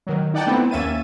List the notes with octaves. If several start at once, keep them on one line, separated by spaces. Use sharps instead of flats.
D#3 F#3
D#4 D5 F#5 G5 A5
A3 B3 C4 E4
D#2 A#3 C#4 E5 A6 D#7